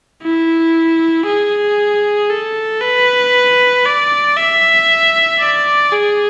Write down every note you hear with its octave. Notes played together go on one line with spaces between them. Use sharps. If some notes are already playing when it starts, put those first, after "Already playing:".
E4
G#4
A4
B4
D5
E5
D5
G#4